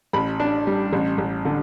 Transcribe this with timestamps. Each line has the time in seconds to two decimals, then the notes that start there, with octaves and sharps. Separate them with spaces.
0.13 A1 B5
0.40 D4
0.67 G3
0.93 A1
1.18 A1
1.45 D3